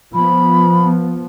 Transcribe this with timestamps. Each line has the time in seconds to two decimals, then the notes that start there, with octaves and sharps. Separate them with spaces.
0.15 F3 B3 B5